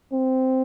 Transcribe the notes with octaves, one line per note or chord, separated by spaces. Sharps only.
C4